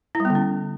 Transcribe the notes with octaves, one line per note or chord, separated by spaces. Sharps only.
E4
G3
B3
D3
C#4